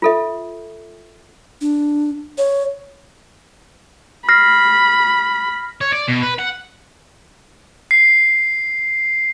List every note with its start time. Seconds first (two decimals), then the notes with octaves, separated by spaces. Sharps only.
0.02 F4 A4 E5
1.61 D4
2.38 C#5
4.29 B5 F6 A#6 C7
5.81 C#5
5.93 D5
6.08 B2
6.22 B4
6.39 F#5
7.91 C7